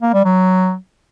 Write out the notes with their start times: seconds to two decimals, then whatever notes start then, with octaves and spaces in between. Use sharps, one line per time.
0.02 A#3
0.13 G3
0.25 F#3